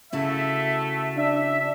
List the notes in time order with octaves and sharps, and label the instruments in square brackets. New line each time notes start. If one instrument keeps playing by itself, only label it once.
[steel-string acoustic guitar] C#3 E4 F#4 [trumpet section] A3 E5
[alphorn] D4 [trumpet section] E5